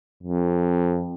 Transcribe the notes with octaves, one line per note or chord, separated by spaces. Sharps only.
F2